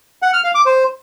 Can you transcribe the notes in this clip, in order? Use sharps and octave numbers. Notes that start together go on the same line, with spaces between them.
F#5
F6
F5
D6
C5